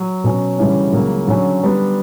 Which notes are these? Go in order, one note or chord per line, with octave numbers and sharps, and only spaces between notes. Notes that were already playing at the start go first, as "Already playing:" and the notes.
Already playing: F#3
B2 F#3 C#4
D2 C#3 E3 G3 C#4
C#2 C#3 F#3 A#3
D3 F#3 C#4
D3 G3 B3 D4